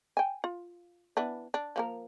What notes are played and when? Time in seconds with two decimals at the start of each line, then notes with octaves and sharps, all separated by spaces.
0.17 G5 G#5
0.44 F4
1.17 E3 B3 D4
1.54 D4
1.76 F3 A#3 A#4